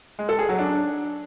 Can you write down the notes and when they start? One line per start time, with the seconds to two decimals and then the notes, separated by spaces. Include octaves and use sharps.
0.19 G#3
0.29 A4
0.39 G#4
0.49 F#3
0.59 D4